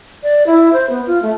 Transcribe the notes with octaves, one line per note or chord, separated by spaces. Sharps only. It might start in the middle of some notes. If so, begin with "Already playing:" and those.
D5
E4
C5
B3
F4
A3